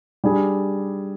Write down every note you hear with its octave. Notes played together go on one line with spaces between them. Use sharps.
G3 D4 G#4